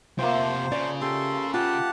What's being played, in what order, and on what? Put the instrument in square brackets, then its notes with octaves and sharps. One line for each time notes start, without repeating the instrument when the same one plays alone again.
[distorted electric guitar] C3 A4 [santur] F3 A3 A#3 [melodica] C5
[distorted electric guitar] C#3 [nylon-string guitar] D5
[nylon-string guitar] G4 [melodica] A4 C6
[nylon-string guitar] F4 [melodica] G4 F#5 A5